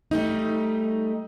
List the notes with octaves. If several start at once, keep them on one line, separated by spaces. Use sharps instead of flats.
G3 A3 D#4